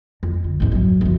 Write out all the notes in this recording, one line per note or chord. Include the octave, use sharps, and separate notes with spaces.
F2
D3
A1 E2
F#2 F#3
F#2 F3